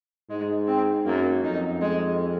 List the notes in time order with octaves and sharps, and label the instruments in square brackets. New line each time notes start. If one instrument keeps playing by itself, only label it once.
[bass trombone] G#2 [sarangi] G#3
[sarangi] C4
[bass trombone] F#2 [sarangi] A#3
[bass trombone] F2 [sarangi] D#4
[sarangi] G#3